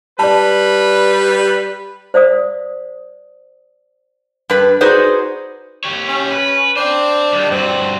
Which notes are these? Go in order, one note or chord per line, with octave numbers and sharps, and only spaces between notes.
G3 B4 D5 A5 B5
C5 D5 F5 D#6
G2 B4
D#4 F#4 G#4 B4 C5 D5
G4 C#5
C#4
B4
D4 C5 G5
D#3 G3
G2 C4 F#4